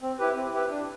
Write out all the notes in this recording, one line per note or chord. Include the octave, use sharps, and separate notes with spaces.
C4
E4 G4 B4
C4
E4 G4 B4
D4